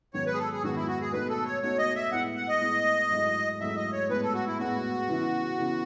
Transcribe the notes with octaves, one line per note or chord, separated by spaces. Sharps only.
G#2 D#3 F#3 B3 C#5
B4
G#4
A4
G#4
G#2 D#3 F#3 B3 F#4
E4
F#4
G#4
B2 A3 D#4 F#4 B4
A4
C#5
B2 A3 D#4 F#4 C#5
D#5
E5
A2 G#3 B3 E4 F#5
F#5
D#5
A2 G#3 B3 E4
G#2 F#3 A3 E4
G#2 F#3 A3 E4 E5
D#5
C#5
A2 G#3 B3 B4
A4
F#4
E4
A2 G#3 B3 F#4
C#3 E3 B3 E4
C#3 E3 B3 E4